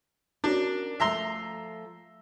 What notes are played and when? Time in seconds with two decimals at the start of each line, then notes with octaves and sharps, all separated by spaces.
0.44 C#4 D4 F#4 A#4
1.00 F3 A3 E5 A#5 C6